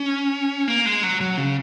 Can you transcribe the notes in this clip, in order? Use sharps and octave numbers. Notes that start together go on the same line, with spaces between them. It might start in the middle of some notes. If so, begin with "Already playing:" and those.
Already playing: C#4
A#3
G#3
F#3
F#3
C#3